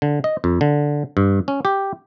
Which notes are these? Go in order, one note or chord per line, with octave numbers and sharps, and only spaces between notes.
D3
D#5
F2
D3
G2
C#4
G4